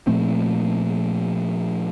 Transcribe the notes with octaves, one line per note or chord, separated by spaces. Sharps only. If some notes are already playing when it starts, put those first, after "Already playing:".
A#2 F3 A3 C4